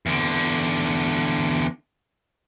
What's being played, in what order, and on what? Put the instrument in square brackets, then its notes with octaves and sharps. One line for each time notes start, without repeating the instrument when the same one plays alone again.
[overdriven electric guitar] E2 D3